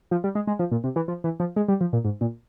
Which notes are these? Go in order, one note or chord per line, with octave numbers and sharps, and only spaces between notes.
F3
G3
G#3
G#3
F3
A#2
C3
E3
F3
E3
F3
G#3
G3
F3
A#2
G#2
A#2